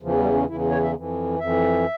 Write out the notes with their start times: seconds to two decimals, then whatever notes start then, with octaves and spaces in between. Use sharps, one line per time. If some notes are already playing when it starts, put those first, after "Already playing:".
0.02 E2 C#3 E3 F3
0.18 G3
0.33 C#4
0.48 E2 C#3 E3 E4
0.71 C#5
0.83 E5
0.94 F2 E3
1.40 F2 E3 E5